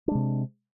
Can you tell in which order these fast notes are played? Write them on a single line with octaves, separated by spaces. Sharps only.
D4 G#3 C3